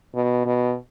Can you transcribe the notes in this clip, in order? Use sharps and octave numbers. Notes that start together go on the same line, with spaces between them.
B2
B2